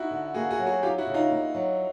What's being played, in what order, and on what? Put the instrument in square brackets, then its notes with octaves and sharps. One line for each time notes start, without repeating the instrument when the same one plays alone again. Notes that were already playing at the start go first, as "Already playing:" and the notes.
Already playing: [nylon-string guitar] D#4 [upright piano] E4 F#4
[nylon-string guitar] D3
[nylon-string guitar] A#3 [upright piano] F#4 G#4
[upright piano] F#4 G#4
[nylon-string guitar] F#3
[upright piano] F#4 G#4
[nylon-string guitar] D#4 [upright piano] F4 G4
[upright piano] E4 F#4
[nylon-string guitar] C#3
[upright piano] D#4 F4
[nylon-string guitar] A#3
F#3